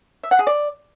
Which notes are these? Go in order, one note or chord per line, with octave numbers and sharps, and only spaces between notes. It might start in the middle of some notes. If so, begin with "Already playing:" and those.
E5
F#5
G#4
D5